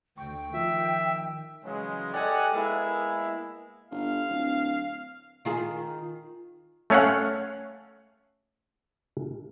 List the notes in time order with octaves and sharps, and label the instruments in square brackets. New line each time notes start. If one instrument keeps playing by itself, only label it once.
[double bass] D2 [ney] G5 [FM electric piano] C#6
[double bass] D#3 [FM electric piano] F3 F4 [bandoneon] E5
[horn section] C#3 E3 F#3 G#3
G4 A4 D5 D#5 F#5 G#5
G#3 A#3 B3 E4
[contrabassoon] G1 [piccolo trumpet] F5
[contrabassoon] D1
[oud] D#3 F4 G#4
[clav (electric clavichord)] A3 C#4 C#5 F5 F#5